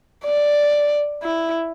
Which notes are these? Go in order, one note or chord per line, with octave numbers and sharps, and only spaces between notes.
D5
E4